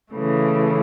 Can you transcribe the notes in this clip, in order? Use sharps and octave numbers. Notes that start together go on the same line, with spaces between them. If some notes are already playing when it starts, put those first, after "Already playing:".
C#3 E3 A3